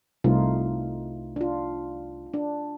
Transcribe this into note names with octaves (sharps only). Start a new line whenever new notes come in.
C2 A3 D#4 F4
D4 F4
D4